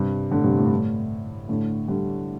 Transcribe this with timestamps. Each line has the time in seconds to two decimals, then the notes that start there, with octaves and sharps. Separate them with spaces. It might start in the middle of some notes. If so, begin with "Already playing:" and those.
Already playing: G2 C3
0.31 A2 D3
0.44 G2 C3
0.57 A2
0.65 G2
0.74 A2
1.49 A2 D3
1.88 D3 G3